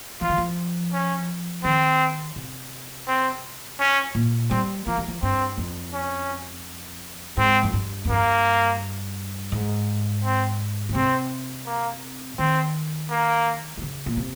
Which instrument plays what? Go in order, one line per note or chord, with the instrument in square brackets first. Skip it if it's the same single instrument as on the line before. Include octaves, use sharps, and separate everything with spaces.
[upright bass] F3 [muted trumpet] F4
[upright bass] D#3
F3
[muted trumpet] C#4
[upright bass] D#3 [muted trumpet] C4
[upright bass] C3
[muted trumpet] C4
C#4
[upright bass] A#2
[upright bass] G3 [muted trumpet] C4
[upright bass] F3 [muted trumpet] A#3
[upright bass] G3
F3
[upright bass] G2 [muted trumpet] C4
[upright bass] F2
[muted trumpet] C#4
[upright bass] G#2 [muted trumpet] C4
[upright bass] F2
G2
F2
[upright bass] G2 [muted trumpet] A#3
[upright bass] G#2
[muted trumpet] C4
[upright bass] C#3
[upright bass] C3 [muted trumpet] C4
[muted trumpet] A#3
[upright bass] D#3 [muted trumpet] C4
[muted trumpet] A#3
[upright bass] D#3
C#3
A#2
C3